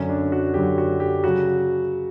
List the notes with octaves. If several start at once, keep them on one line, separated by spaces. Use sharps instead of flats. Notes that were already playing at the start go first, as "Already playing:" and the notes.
Already playing: F#2 D3 F#3 C#4
D4
F#4
F#2 D3 F#3 G4
F#4
G4
C#3 F#3 F#4